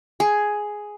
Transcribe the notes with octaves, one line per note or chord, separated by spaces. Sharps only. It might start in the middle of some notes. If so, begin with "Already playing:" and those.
G#4